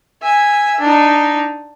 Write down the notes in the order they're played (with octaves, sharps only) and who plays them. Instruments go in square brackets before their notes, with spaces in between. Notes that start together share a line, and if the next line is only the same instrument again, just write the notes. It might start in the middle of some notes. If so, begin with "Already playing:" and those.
[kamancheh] E5 G#5
D4 D#4